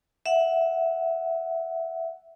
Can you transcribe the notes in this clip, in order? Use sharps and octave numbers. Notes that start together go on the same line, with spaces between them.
E5 F#5